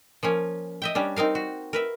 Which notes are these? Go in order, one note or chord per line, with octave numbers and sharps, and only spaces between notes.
F3 A#3 C#4
D#5 E5 G5
G3 C#4 D4
C4 D#4 A#4 F5
F#4
A#4 B4 E5